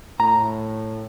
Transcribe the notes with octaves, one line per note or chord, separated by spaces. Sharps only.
A2 A#5